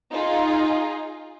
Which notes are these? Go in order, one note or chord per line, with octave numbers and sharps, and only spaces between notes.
D#4 F4 G#4